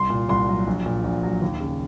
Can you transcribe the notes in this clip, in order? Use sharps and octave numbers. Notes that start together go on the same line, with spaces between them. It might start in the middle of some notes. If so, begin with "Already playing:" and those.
Already playing: C2 C6
A#2
C2 C6
F#3
A#1
A#2
A#1
F#3
D#2
C#3